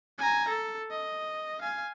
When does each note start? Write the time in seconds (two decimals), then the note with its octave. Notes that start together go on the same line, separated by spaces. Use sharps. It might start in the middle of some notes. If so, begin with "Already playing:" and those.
0.18 G#5 A#5
0.49 A4
0.91 D#5
1.62 F5 G#5